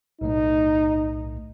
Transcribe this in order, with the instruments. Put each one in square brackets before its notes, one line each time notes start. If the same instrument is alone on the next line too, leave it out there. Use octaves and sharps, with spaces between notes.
[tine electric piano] B1 A2 A3 [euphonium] D#4